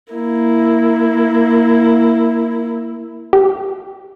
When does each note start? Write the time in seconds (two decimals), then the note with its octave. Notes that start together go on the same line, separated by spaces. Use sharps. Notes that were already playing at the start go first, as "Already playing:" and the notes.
0.13 A#3 E4
3.33 G4